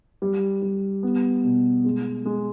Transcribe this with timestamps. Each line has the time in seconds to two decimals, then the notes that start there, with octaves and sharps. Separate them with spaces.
0.22 G3
0.62 G3
1.03 B3
1.44 B2
1.84 G#3
2.25 G#3